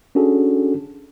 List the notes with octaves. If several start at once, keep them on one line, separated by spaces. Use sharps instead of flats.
C#4 D4 F#4 G#4 A4